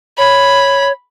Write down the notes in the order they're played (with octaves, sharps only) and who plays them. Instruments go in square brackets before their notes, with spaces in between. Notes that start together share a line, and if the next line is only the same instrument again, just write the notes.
[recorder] C#5 [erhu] B5